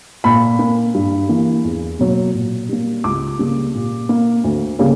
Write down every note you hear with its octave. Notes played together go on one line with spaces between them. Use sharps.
A#2 B5
A#3
G2
E3 A#3
E2
B2 F#3 A#3
A#2
G3 A#3
C#2 D6
C#3 G3 A#3
A#2
A#3
D2
C#3 G3 A#3